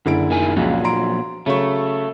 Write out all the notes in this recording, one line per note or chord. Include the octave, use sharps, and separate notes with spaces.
F#1 D3 E4 D7
A#2 D#3 G#5
C#2 A#2 F3 F#3
A#5 C6 D7
C#3 F#3 A3 C#6